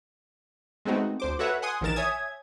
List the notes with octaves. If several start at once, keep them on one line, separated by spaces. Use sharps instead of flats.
G#3 A3 B3 C4 D#4 F#4
D2 C5 D6
F#4 A4 B4 C#5 E5 F#5
F#5 G#5 C6 D#6
A#1 D#3 E3 A#4 A6 E7
C#5 E5 G#5 D#6 G#6